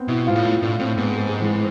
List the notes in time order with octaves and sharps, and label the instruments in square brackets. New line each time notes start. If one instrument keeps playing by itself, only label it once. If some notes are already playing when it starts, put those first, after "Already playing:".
Already playing: [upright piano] B3 C4
[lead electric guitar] B2 [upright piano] E4
[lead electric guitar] G#2 [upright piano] F4
[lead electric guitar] A2
[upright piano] E4
[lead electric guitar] A2 [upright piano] D4
[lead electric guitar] A2 [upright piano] C4
[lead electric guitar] G#2 [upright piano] B3
[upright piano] A3
G#3
E3